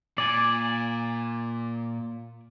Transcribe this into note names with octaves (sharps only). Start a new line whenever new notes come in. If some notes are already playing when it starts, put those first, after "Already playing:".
A#2 D5 G#5